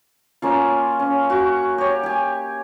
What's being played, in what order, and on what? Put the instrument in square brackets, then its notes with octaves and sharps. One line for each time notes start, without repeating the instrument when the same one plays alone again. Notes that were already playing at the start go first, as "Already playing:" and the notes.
[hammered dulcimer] A#3 C#4 F4
C#4
F#4
G4 C#5
G4 G#5